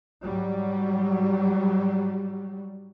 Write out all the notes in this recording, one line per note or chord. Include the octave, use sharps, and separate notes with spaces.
G#2 F#3 G3